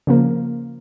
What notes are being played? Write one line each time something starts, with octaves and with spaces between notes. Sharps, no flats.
C#3 F3 A#3